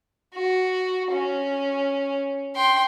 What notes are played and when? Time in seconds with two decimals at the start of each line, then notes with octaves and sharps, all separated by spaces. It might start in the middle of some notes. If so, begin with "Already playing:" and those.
0.34 F#4
1.12 C#4
2.55 G5 C6